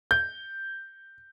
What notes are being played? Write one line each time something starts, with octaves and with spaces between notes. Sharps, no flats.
G6